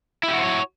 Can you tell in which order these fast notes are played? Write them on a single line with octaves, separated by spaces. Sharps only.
E4 G4 F#4 C5 C#5